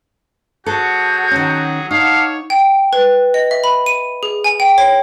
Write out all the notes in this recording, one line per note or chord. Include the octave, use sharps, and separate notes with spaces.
F#3 F#4 G#4 A4 F#5 A5 G6
D#3 C#4
D#4 C#5 F5 F#5 A5 D6
G5
B4
D#5
E5
B5
D#7
G#4
G#5
G5
C#5